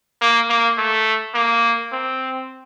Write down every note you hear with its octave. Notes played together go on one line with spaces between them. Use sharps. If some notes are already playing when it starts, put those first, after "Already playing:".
A#3
A#3
A3
A#3
C4